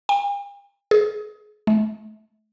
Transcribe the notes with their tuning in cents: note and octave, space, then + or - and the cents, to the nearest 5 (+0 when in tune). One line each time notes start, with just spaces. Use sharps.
G5 +45
G#4 +30
A3 -40